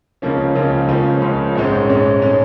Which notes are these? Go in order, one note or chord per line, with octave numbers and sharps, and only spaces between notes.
C#2 C#3 F3 A#3 C#4
C#2 C#3 F3 A#3 C#4
C#2 C#3 F3 A#3 C#4
C#2 C#3 F3 A#3 C#4
A#1 G#2 G#3 C#4
A#1 G#2 G#3 C#4
G#3 C#4